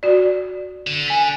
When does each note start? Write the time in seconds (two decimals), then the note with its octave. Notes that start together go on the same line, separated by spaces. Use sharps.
0.03 F#4 D5
0.87 D3
1.06 G#5 B6 F7